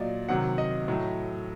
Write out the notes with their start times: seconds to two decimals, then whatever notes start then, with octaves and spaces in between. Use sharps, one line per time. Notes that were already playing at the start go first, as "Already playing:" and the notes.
Already playing: A#2 F#3 D5 D#5
0.29 C3 D#3 F#3 F#5
0.58 D#5
0.88 A2 F#3